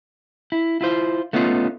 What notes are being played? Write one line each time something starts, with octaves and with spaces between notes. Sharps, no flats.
E4
E4 F4 C5
A3 B3 C#4 D#4 F4